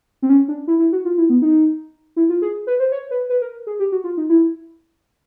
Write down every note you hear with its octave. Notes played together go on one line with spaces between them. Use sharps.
C4
C#4
D4
E4
E4
F#4
F4
E4
B3
D#4
E4
F4
G#4
B4
C5
C#5
B4
B4
A#4
G#4
G4
F#4
F4
D#4
E4